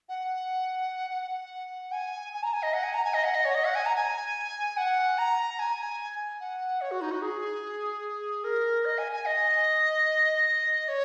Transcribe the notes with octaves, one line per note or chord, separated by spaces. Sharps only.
F#5
F#5
G#5
G#5
A#5
G#5
D#5
F#5
G#5
A#5
G#5
D#5
F#5
D#5
C#5
D#5
F#5
G#5
A#5
G#5
F#5
A#5
G#5
F#5
C#5
F#4
D#4
F#4
G#4
A#4
D#5
G#5
G#5
D#5
C#5